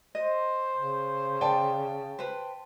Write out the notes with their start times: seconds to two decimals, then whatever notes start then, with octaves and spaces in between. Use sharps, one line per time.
0.15 C5 D#5
0.76 C#3
1.41 D5 G5 A5
2.19 B4 C5